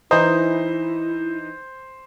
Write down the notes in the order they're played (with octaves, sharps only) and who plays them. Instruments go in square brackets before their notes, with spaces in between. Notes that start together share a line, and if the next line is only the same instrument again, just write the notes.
[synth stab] E3 D#4 [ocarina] E4 [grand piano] C5